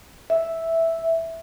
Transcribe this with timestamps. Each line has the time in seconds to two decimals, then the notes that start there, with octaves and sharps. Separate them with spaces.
0.30 E5